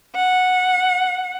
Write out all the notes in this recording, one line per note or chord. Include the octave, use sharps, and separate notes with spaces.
F#5